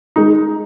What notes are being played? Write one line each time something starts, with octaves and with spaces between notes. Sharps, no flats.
G#3 D#4